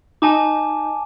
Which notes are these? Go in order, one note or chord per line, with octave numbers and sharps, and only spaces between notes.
D#4 G#5 A5 D6